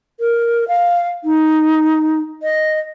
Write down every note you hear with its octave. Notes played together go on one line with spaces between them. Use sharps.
A#4
F5
D#4
D#5